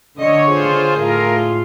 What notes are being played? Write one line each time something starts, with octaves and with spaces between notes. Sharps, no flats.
D3 C#5 D#5
F4 G#4 C5
A2 F4 A#4